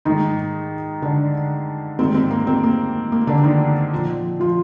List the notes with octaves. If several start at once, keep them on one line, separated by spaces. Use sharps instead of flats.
G#2 D#3 D#4
D3 D4
G#2 D#3 C4
C4
A#3
C4
A#3
A#3
D3 D4
D#3 D#4
A#2 F3
F3 F4